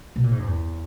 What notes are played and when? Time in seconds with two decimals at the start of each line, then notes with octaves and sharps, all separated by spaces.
0.16 B2
0.24 A#2
0.31 G#2
0.39 F#2
0.47 E2